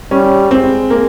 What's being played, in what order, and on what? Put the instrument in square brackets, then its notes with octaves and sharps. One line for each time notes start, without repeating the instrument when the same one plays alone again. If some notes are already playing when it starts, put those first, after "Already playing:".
[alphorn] G3 [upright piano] C#4
[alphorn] G#3 [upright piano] C4
[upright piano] A#3